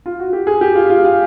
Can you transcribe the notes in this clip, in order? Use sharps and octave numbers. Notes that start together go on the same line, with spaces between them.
F4
F#4
G4
G#4
G4
F4
F4
F4